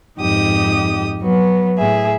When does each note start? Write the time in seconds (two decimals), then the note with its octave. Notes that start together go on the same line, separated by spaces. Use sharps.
0.19 F2 G#2 D#4 G4 D#6
1.20 F#3 B3
1.77 A2 G#4 E5